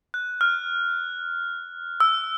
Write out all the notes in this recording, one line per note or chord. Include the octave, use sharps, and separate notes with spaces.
F#6
F6
E6